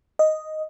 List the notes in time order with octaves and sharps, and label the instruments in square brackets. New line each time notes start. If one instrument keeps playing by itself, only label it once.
[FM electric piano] D#5